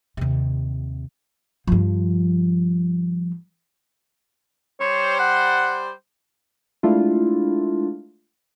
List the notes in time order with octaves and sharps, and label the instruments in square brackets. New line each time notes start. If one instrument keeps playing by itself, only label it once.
[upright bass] D#2 C3
G2 F3
[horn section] G3 C5 [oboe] C#5
[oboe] F#5
[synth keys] G#3 A3 D4 E4 F4